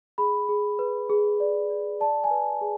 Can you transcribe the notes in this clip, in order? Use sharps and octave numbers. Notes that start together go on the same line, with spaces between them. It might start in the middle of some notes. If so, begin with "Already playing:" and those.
G#4 B5
G#4
B4
G#4
D5
D5
D5 A5
G#5
B4
G#4